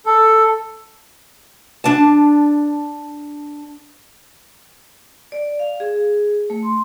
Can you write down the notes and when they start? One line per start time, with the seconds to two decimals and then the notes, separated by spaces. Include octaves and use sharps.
0.06 A4
1.84 D4 A5
5.32 D5
5.59 F5
5.80 G#4
6.50 A3
6.63 C6